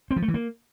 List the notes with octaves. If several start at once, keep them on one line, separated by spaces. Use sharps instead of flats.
C4
F3
A3
E3
A#3